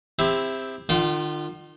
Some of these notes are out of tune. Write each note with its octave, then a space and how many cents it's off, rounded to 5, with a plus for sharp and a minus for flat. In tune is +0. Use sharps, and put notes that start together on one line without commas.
C4 +0 E4 +0 G4 +40
D#3 -45 F4 +0 G5 -30